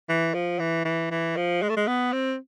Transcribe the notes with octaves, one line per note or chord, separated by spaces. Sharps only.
E3
F3
E3
E3
E3
F3
G#3
A3
G#3
B3
C4